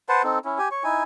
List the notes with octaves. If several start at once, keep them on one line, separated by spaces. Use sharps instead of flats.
B4 C5 F#5 A5
C4 D#4 A4
C#4 E4
G4 G#5
C#5 C#6
D#4 E4 G#5